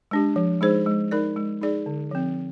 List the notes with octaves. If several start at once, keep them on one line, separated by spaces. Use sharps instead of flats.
G#3 D4 G4
F3
G#3 D#4 G#4 C5
G#3
D#4 A#4 D5
G#3
D#4 G#4 D5
D3
F3 C4